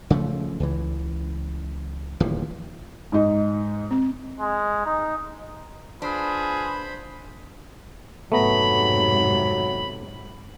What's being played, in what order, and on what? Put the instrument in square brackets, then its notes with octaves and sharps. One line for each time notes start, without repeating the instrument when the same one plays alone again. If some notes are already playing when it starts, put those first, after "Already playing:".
[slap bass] C#3 F3 F#3 A3
C#2 E3
D1 D#2 E3 F3
[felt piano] G#2 D#4
[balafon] C4
[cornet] G#3
D#4
[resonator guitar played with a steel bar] D4 [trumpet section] F4 G#4 [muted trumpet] B4 [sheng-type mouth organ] C5 B5
[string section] F2 G#2 C3 [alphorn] F#3 [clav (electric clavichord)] A3 B3 A#5 [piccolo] B5